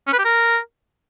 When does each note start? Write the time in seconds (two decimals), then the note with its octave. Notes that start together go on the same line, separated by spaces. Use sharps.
0.07 C#4
0.13 B4
0.19 G4
0.25 A#4